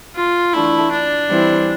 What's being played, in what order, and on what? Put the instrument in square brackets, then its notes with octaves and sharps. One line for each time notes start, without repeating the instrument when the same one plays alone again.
[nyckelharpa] F4
[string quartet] E3 A3 D4 [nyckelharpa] E4
[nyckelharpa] D4
[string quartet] E3 G3 C4 E4